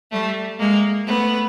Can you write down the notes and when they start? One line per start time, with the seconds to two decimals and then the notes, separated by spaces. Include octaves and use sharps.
0.11 G3 A3
0.59 G#3 A#3
1.06 A3 B3